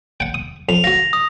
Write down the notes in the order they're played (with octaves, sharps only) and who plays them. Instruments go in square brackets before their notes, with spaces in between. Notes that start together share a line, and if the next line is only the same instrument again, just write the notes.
[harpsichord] F#5 G5
D#6
[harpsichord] F2 [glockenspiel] F7
[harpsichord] F#4 F5 [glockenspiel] A#6
[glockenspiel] D#6